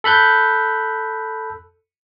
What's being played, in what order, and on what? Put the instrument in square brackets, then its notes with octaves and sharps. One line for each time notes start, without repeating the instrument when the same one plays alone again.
[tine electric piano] A4 B5 F#6 G6